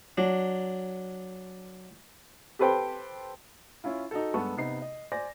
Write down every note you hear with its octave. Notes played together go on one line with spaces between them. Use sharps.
F#3 D4
G4 A4 B4 C5 G5
C#4 E4 F4
D#4 F#4 A4
G2 G#3 B3 A4 A5 C#6
C3 B3 D#4 C7
D#5
C5 D5 G#5 A#6